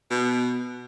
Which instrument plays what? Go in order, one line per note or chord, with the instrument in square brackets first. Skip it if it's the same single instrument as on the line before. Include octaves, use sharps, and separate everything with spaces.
[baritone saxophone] B2